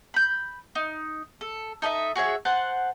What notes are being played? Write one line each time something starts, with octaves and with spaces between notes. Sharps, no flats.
B5 G6
D#4
A4
D#4 A4 D#5 E5
F#4 G#4 C#5 E5
C5 F#5 A5